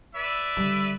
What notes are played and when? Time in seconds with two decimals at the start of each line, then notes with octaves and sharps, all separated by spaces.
0.15 B4 D5 E5
0.57 D3 G3